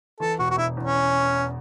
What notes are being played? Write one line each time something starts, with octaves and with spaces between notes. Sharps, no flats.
E3 A4
E1 F#4
F#4
E1 E4
E2
C#4